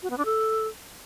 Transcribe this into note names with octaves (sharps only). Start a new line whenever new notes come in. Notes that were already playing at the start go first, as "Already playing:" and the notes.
F#4
B3
D4
A4